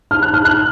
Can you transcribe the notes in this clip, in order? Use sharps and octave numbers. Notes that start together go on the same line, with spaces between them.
F6
F#6
F6
F#6